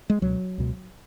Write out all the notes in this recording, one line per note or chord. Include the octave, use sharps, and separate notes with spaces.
G#3
C#2 B2 F#3
C#2 B2